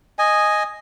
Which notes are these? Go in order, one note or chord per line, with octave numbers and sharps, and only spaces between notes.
D#5 G#5